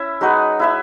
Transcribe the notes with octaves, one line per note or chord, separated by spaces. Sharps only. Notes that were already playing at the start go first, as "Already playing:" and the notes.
Already playing: C#4 E4 E5
G#3 D#4 F#4 B4
E4 B4 E5